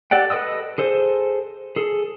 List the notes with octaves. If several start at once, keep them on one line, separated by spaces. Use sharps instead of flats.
G4 A4 D5 F#5 G5
A4 B4 D#5 D#6 E6
G#4 A4 C5
G#4 A4